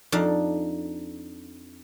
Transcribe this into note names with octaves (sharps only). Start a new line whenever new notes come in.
F2 D4 D#4 F5 A5